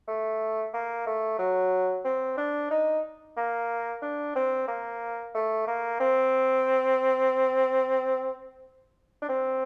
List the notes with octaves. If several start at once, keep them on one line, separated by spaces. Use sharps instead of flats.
A3
A#3
A3
F#3
C4
D4
D#4
A#3
D4
C4
A#3
A3
A#3
C4
D4
C4